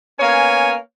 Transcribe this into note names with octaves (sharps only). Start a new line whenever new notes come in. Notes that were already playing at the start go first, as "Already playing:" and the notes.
A#3 B3 C#4 C#5 G#5